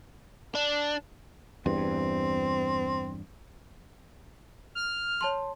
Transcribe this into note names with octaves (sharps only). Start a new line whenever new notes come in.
D4
E2 G2 C4
F6
C#5 A5 C6